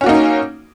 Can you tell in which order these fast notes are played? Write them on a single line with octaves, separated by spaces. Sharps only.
C#4 F#4 A#3 D#4